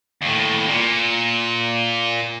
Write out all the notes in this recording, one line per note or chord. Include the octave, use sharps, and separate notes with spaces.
D#2 A2
A#2